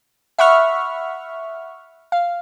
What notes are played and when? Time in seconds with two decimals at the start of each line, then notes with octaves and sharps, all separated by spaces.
0.38 E5 F#5 B5 C#6 F6
2.12 F5